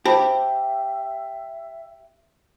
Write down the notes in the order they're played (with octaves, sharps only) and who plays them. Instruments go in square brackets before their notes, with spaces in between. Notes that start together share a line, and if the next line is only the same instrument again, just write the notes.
[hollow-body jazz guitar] G4 [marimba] C5 A5 B5 [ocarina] E5